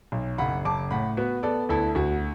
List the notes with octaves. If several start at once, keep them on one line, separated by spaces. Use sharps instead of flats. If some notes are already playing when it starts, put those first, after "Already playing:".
B1
F#1 F#5 B5
F#1 A5 D6
A2 F#5 B5
B3 F#4 B4
B3 A4 D5
D2 E4 A4
D2 F#4